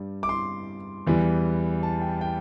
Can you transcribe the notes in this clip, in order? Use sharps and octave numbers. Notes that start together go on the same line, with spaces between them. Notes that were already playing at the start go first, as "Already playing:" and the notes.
Already playing: G2 G3
D6
C6
E2 E3 G3
A5
G5
G5